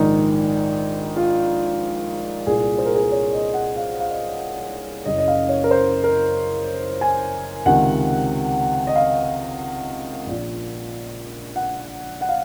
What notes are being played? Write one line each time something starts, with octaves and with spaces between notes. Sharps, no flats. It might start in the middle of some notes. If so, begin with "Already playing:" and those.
Already playing: A#1 G#2 D#3 D#4
F4
C2 A#2 G#4
C5
A#4
G#4
A#4
C#5
D#5
F#5
F5
F5
D#5
F#1 F#2 C#3 D#5
D#5
F5
C#5
A#4
C5
A#4
G#5
C#2 C3 D#3 F#5
D#5
F5
A#1 A#2
F#5
F#5
F5